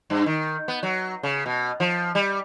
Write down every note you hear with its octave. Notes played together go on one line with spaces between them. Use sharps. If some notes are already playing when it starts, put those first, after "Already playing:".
G2
D#3
B3
F#3
C#3
B2
F3
G3